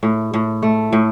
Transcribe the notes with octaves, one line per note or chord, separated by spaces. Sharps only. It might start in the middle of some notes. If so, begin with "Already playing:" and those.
A2
A2
A3
A2